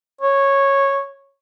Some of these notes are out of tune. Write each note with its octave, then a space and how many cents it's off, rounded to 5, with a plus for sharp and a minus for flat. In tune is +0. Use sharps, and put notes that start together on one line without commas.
C#5 -10